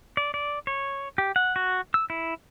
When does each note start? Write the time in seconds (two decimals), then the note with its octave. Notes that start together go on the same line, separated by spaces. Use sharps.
0.17 D5
0.34 D5
0.67 C#5
1.18 G4
1.36 F#5
1.56 F#4
1.94 E6
2.10 E4